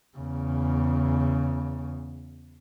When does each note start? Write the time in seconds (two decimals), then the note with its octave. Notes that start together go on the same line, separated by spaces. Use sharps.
0.17 E2 C#3